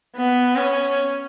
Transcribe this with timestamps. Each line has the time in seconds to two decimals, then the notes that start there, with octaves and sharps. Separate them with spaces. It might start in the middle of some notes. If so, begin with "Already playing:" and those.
0.16 B3
0.56 C#4